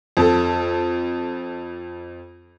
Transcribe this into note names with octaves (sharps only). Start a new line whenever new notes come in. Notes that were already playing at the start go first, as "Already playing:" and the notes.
F2 A4